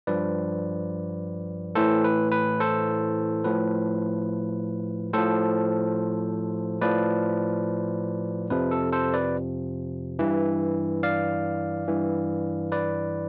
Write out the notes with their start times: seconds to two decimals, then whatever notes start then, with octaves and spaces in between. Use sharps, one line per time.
0.07 G2 F3 B4 D5
1.75 A2 E3 A4 C5
2.04 B4
2.32 B4
2.60 A4 C5
3.44 A2 F3 B4
5.13 A2 F3 A4 C5
6.81 A2 F3 B4 D5
8.50 F2 C3 F3 B4
8.71 A4
8.93 A4 C5
9.14 B4 D5
10.19 G2 E3
11.03 D5 F5
11.88 G2 E3
12.72 B4 D5